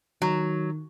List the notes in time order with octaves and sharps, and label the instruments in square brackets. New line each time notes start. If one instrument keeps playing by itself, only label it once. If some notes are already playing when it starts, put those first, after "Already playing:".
[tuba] D#3 [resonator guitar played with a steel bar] F#3